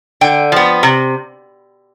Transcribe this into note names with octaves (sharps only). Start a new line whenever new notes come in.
D3 G5
F3 B3
C3